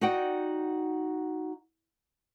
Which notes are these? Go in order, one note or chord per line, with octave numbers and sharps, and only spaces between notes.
D#4 F#4 D5 F#5 G5